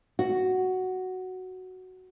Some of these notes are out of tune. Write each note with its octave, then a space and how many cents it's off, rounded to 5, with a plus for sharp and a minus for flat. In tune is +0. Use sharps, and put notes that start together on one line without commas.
F#4 +5